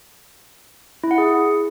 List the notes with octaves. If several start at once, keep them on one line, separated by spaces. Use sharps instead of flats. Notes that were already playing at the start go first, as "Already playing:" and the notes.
E4
F#5
G#4